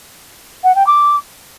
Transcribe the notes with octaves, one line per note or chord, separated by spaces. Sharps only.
F#5
G5
D6